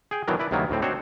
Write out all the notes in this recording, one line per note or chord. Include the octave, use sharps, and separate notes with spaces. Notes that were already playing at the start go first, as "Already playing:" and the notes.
G#4 G5
B2 D#3 E3 F#3 D4 A#4
E4 B4 D5
D2 C3 D#3 F#3 A#3 B3
D2 A2 C4
C4 D4 D#4 F#4 C5 C#5